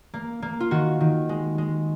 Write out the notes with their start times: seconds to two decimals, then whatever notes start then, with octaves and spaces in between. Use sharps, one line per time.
0.14 A#3
0.42 A#3
0.60 F4
0.71 D#3 F#4
1.00 D#3
1.29 G#3
1.58 G#3